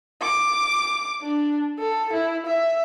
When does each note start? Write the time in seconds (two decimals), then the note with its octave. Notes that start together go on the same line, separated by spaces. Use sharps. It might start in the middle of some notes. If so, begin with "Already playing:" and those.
0.22 D6
1.22 D4
1.79 A4
2.13 E4
2.46 E5